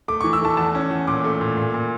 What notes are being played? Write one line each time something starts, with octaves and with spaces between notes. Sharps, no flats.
A3 D6
E3 C#6
E6
A3 A5
E2 A5
C#4
E2
A#2 D6
A3
A#2
A#2
A#2